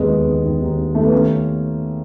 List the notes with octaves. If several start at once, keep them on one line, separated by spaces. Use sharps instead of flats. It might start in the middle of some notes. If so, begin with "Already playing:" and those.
Already playing: D#2 D#3 G#3 B3
D#2
D#3
D#3
D#2
D#2
D#3 A3
B3
D#2 A3 C#4